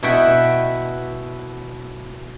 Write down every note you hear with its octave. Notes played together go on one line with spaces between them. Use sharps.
B2 E4 B4 E5 F#5 G5